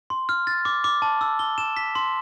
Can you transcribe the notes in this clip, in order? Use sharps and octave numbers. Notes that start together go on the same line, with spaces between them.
C6
F6
A6
D6
D6
A5
E6
G7
E7
B6
C6